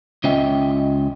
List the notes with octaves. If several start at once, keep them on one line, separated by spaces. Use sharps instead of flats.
C#2 C#4 F4 D#5 E5 G5